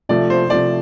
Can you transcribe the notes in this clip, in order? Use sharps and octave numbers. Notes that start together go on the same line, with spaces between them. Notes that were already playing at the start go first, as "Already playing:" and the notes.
C3 F3 A3 D5
C5
C3 F3 A3 D5